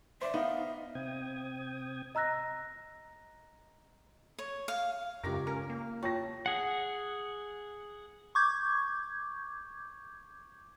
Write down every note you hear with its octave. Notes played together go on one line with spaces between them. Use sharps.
C5 D5 E5
B3 D#4 F5
C3 C4 G5 D#6 G#6
D#5 A#5 E6 F#6 A#6
C#5
F5
C#2 F#2 G4 A#4 C#5 D5 A#6
C#4 A#4
A#3
F4 C#5 G5 A5 C#6 A#6
G#4 F#5
C#6 D6 G6 G#6